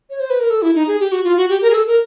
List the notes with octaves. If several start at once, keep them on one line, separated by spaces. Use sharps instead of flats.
C#5
C5
B4
A#4
A4
E4
D#4
G#4
G4
F#4
F4
F#4
G4
A#4
G#4
A4
A#4